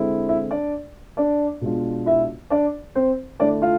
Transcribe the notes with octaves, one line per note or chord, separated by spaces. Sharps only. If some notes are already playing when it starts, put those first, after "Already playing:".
Already playing: D3 G#3 C4 E4
E4 E5
D4 D5
D4 D5
B2 G#3 D4 F4
E4 E5
D4 D5
C4 C5
D3 A3 D4 E4 D5
F4 F5